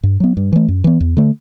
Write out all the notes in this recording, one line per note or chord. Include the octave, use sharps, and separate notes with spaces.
G2
F#3 B3
G2
E3 A3
F#2
E3 B3
E2
D3 A3